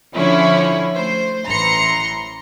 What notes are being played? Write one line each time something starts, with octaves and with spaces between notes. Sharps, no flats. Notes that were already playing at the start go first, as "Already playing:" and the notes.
D3 F3 C#4 E4 C#5
A3 C5
A1 E3 A#5 C6 A#6 C#7